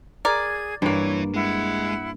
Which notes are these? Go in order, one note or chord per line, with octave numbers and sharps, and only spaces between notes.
G#4 A#4 D5 G#6
G2 E3 A#3 C#5
G#3 E4 F#5